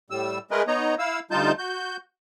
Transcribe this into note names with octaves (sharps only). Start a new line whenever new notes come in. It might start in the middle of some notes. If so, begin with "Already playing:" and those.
A2 G3 E6
G#3 A3 G#4 A#4 B4 D#5
B3 D#4 C#5 D#5 A#5
E4 F5 E6
D2 G3 D#4 F4 A5 G6
F#4 G6